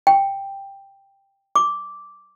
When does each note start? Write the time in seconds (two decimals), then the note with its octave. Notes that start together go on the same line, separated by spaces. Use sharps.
0.07 G5
1.55 D6